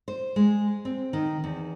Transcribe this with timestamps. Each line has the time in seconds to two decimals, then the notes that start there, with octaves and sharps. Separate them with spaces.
0.08 C5
0.36 G#3
0.85 C4
1.13 D#3
1.44 E2